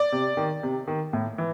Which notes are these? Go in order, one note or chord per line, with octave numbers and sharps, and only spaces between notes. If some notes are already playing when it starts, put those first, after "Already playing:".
Already playing: D5
C3
D#3
C3
D#3
A2
E3